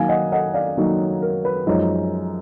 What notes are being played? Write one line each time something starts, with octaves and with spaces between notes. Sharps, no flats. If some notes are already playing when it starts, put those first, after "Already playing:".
Already playing: D#3 F#3 A#3 D#4 F5 G#5
D#5 F#5
D#5 F#5
D5 F5
D#3 F#3 A#3 D#4
A#4
B4
F#2 F3 G#3 D#4